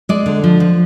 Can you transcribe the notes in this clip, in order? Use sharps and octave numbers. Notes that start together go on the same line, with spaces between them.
G#3 D5
D3
F3
F3